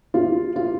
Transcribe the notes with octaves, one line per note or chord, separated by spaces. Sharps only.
F4
F4